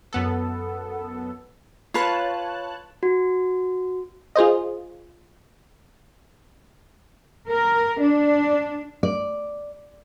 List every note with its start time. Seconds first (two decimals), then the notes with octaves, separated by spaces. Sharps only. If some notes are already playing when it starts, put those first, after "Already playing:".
0.13 F#2 B3 A4
1.94 F4 B4 C#5 A5 F#6
3.03 F#4
4.36 F4 G#4 C5 D#5
7.49 A#4
8.00 D4
9.03 D5